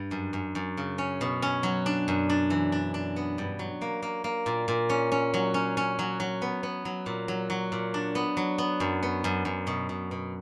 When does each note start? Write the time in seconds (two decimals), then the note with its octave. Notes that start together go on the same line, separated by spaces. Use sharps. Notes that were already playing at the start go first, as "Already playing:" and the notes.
Already playing: G2
0.11 F#2
0.33 F#2
0.55 F#2
0.77 C#3
0.98 C#4
1.21 B2
1.42 C#4
1.63 F#3
1.86 D4
2.08 F#2
2.30 D4
2.50 E3
2.72 D4
2.94 D4
3.16 B3
3.38 G2
3.59 F#3
3.82 A#3
4.02 A#3
4.24 A#3
4.46 A#2
4.68 A#2
4.90 C#4
5.12 C#4
5.34 F#3
5.54 C#4
5.77 C#4
5.99 F#3
6.20 F#3
6.42 B3
6.63 B3
6.85 F#3
7.06 A#2
7.28 F#3
7.50 F#3
7.72 A#2
7.94 D4
8.15 B3
8.37 F#3
8.58 B3
8.80 F#2
9.03 B3
9.24 F#2
9.45 F#2
9.67 B2
9.89 B2
10.11 B2